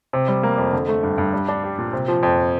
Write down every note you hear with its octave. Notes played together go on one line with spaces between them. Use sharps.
C3
G3
A#3
F2
D3
A3
G2
G2
G3
D4
G4
A#2
C3
F3
F2